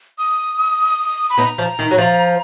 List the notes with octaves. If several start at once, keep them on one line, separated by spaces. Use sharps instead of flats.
D#6
B5
B3 D#4 A#5
F3
D#3
F#3
F3